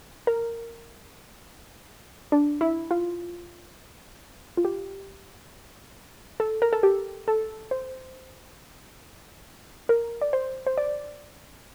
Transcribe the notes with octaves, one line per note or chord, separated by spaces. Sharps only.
A#4
D4
E4
F4
F4
G4
A4
A#4
A4
G4
A4
C5
A#4
D5
C5
C5
D5